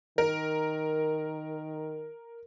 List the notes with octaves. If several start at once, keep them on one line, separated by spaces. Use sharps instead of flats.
D#3 A#4